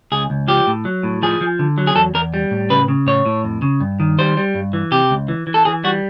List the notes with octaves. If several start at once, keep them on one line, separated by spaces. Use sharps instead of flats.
C#2 G#4
C#2
F3 G4
A2
F#3
A2
F3 G#4
F3
D3
F#3
G#4
E2 A4
E2 A#4
G3
A2
C#3 B4
C#3
A2 C#5
A2
F2
C#3
G2
D#3
G3 C5
G3
G2
E3
C3 G4
C#2
E3
E3
A4
E3 G#4
G3 F#4